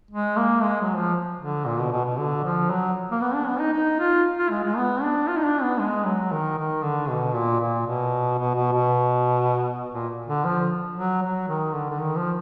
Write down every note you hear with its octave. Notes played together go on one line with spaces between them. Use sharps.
G#3
A#3
G#3
F#3
F3
D3
A#2
B2
B2
B2
D3
F3
F#3
A#3
B3
D4
B3
D#4
D#4
F4
F4
G#3
G#3
B3
D4
F4
D#4
D4
B3
G#3
F#3
D#3
D#3
D3
B2
A#2
A#2
B2
B2
B2
B2
A#2
D3
F3
F#3
F#3
D#3
D3
D3
D#3
F3